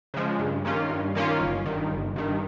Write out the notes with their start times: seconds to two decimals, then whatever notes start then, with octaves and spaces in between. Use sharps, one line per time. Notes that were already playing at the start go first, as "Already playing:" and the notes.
0.14 C#3 F3 G#3
0.39 G2
0.65 D#3 A#3 C#4 F4
0.90 G2
1.15 D#3 A#3 C#4 F4
1.40 G1
1.66 G2 D#3
1.91 G1
2.16 G2 D#3